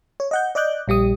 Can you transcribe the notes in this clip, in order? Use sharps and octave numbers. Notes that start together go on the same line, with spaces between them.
C#5
D#5 F#5 G6
D5 D#5 D6 F#6 G6
A#1 G3 G4 D#6